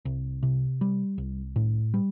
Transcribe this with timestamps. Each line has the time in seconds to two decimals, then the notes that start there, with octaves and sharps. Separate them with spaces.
0.05 C2
0.43 C3
0.81 G3
1.18 C2
1.56 A2
1.94 G3